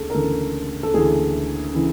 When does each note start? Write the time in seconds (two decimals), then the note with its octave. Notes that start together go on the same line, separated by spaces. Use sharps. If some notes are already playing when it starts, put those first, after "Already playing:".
Already playing: D2 C#3 G#4 A4
0.10 A#4
0.14 D2 C#3 E3 A4
0.83 A4
0.94 D2 C#3 E3 G#4
1.74 C#3 E3